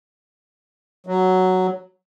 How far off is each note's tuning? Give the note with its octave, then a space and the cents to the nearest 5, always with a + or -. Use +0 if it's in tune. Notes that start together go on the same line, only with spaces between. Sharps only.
F#3 +5